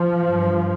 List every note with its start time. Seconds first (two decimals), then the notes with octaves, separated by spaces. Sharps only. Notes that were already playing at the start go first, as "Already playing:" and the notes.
Already playing: F3
0.28 G2